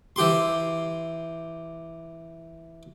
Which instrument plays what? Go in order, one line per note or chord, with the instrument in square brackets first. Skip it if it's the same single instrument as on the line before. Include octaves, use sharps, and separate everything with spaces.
[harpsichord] E3 G4 C6